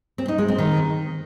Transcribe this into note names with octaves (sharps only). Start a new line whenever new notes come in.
C4
D#4
G#3
C4
D#3